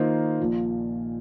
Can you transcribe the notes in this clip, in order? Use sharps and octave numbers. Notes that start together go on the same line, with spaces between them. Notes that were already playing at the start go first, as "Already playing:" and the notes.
Already playing: D#3 A#3 F4 C5 D#5
A#1 A#2 F3